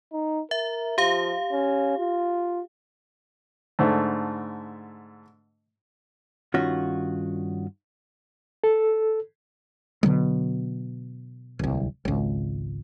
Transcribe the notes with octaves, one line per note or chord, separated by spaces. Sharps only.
D#4
A#4 E5
F3 G4 F5
C#4
F4
G#2 D3 A3
G2 D#3 C#4 F4 F#4
A4
B2 D3 F#3 G#3
D1 C2
G#1 C#2